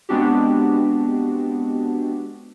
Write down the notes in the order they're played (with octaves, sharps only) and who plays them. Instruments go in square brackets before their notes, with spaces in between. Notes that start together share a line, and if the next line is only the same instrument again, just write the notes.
[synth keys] G#3 B3 C4 D4 F#4 G4